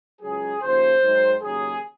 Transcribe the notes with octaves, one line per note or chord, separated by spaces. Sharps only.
C#2 C#3 F#3 G#4
D#2 C#3 F3 C5
G#2 D#3 F#3
D#2 C#3 F#3 G#4